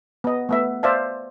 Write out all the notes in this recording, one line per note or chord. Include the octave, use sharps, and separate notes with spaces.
B3 D#5
A3 B3 E5
C5 D5 E5 F5 A5